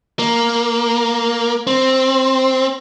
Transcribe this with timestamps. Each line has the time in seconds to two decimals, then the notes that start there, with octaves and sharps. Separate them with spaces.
0.19 A#3
1.67 C4